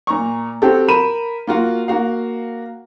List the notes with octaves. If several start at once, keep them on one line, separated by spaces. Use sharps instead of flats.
A#2 A#5 C#6
C4 F#4 G4 A4
A#4 B5 D#7 E7
A#3 F4 F#4
A#3 F#4 F5